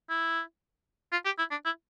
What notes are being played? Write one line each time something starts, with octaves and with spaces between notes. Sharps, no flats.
E4
F4
G4
E4
D4
E4